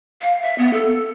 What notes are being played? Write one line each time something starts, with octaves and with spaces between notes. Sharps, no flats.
F5
E5
B3
A4